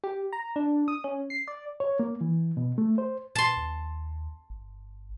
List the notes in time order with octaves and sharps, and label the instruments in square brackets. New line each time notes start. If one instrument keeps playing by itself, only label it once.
[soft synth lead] G4
A#5
D4
D#6
C#4
C7
D5
[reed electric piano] C#5
A#3
E3
B2
A3
C5
[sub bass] A#2 [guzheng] A5 C6
[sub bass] D#2
G1